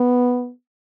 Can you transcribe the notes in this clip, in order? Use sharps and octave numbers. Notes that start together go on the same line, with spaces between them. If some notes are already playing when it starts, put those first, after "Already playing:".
Already playing: B3